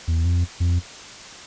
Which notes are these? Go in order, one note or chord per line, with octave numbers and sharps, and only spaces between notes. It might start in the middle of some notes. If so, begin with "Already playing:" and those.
E2
F2
F2